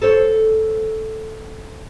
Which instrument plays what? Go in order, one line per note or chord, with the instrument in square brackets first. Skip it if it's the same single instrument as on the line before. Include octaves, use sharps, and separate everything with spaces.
[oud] A4 C5 C#5